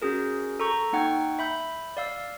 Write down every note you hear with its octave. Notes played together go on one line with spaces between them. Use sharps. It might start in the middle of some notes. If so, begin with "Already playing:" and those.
C#4 F#4 G#4 A#4
A4 A#5 C#6 G6
A#3 D#4 F#5 G5 C#6 G#6
E5 B5 G6
D5 F5 E6